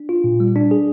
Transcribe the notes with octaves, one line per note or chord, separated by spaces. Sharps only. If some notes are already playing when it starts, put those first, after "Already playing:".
Already playing: D4
F4
A#2
G3
D4
G#4